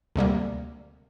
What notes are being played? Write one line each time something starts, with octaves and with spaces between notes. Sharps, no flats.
D2 C3 G3 A#3